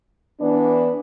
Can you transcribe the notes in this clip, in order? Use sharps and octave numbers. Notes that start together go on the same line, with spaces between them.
E3 B3 D4